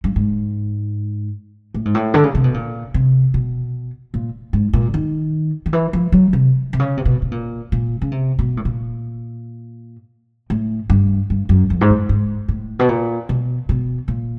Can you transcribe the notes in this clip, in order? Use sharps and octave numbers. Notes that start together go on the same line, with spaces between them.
G2
G#2
A2
G#2
A2
D3
C#3
C3
B2
A#2
C3
B2
A#2
G#2
A#2
D#3
D#3
E3
F3
F#3
C3
C3
C#3
C3
B2
B2
A#2
A#2
C#3
C3
B2
A2
A#2
A2
G2
G2
F#2
F2
G#2
G2
G#2
A2
B2
A#2
B2
B2
A#2